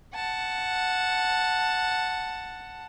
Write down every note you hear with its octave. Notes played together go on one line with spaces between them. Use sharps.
F#5 A5